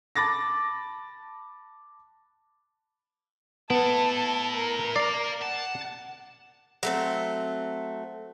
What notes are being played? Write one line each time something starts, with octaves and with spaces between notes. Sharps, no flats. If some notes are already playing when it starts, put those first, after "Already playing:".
A5 B5 D6 A6 A#6
B3 E4 A4 A5
A#4
D5 F5 A#5
F#5 A5
F#3 A3 C4